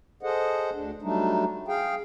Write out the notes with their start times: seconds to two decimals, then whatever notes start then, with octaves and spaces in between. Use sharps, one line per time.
0.23 G#4 A4 C5 D#5 F#5
0.74 D2 D4
1.02 F#3 G3 A3 D4 D#4
1.68 G#4 F5 G5